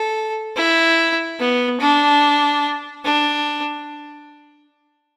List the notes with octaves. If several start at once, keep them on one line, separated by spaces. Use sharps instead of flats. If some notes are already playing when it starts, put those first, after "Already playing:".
Already playing: A4
E4
B3
D4
D4